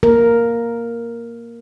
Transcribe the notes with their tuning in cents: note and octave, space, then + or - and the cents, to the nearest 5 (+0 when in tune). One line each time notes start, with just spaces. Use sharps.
A#3 +0 A#4 +0